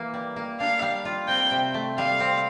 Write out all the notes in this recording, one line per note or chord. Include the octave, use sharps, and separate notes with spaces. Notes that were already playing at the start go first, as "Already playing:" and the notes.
Already playing: E3 A#3
G3
A#3
D4 F5
G3
F4
C4 G5
C3
A3
G3 F5
C4